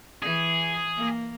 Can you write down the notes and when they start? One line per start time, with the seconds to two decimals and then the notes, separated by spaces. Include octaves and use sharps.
0.22 E3 G#4
0.96 A#3